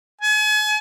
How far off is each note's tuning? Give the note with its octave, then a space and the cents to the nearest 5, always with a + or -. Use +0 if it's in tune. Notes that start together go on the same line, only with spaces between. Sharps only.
G#5 +40